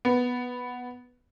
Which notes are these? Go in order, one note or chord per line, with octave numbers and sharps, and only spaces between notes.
B3